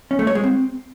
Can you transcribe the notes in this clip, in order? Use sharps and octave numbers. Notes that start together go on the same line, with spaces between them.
C#4
A3
C#5
G#3
C4